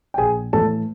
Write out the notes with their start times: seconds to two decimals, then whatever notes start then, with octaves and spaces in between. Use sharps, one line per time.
0.14 G5
0.18 A#1 G#4 G#5
0.53 A2 E3 A4 A5